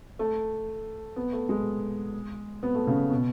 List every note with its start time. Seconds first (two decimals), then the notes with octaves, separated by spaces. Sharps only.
0.19 A3
1.16 B3
1.33 A3
1.49 G#3
2.63 B3
2.75 A3
2.87 C#3
3.11 B2